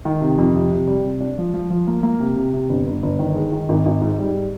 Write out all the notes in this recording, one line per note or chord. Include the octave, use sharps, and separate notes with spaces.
D#3
C3
F2
C3
C3
G3
C3
D4
F3
F3
F3
A#3
A#3
C3
C3
C3
G1
G1
G1
D#3
G#3
D#3
G#1
G#1
G#2
G3